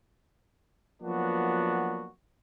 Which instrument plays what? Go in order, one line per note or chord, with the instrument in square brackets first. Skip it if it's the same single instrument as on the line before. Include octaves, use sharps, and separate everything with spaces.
[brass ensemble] F3 F#3 A#3 B3 D4 F#4